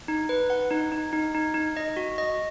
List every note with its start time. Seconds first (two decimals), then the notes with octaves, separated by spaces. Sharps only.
0.08 D#4
0.29 B4
0.50 F#5
0.71 D#4
0.92 D#4
1.13 D#4
1.35 D#4
1.54 D#4
1.77 D#5
1.97 F#4
2.18 D#5